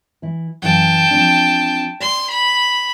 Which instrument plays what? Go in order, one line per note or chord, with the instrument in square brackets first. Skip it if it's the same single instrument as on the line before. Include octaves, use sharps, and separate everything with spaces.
[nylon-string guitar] E3 E4
[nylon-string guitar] F#2 E3 F5 [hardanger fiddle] G5 A5
[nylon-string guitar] F3 C4 D4
[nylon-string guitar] D5 [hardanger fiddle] C6
[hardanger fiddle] B5